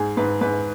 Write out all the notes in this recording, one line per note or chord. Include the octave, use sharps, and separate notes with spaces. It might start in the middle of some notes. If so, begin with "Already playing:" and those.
Already playing: G#2 G#4
G#2 B4
G#2 B4